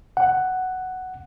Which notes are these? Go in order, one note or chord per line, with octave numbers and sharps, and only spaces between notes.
F#5